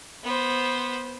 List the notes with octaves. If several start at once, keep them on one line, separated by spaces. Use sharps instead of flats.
B3 C5